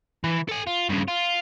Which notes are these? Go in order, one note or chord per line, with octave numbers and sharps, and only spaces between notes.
E3
A4 G#5
F4
G2 C#3
F4